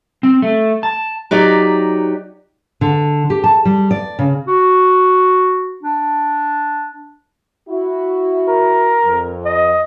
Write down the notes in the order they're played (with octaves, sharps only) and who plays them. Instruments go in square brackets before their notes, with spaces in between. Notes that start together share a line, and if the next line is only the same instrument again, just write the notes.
[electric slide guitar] C4
A3
A5
[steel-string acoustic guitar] F#3 D#4 G4 D5
D3
G4
A5
G3
D5
C#3
[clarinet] F#4
D4
[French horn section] E4 F#4
[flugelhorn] A#4
[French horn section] F2
[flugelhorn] D#5